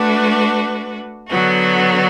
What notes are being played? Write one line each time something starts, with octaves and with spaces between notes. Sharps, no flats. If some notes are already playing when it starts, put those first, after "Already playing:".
Already playing: A3 D4 F#4 B4
D3 F#3 B3 F#4